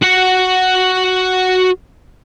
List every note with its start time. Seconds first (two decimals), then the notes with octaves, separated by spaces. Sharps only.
0.03 F#4 F#5